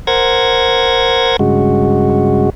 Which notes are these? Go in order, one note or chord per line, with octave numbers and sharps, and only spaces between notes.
A#4 C5 F#5 G#6 A#6
G2 C#3 G#3 F#4